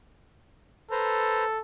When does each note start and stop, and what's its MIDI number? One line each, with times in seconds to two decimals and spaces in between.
0.91 1.61 69
0.91 1.44 71
0.91 1.44 72
0.91 1.44 82